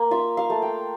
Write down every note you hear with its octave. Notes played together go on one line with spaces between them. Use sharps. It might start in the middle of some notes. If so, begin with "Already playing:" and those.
Already playing: A#3
F4 E5
F5
A3
G5